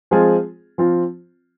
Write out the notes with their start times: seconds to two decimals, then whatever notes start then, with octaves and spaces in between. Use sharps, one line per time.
0.11 F3 G#3 C4 F4 G#4
0.78 F3 C4 F4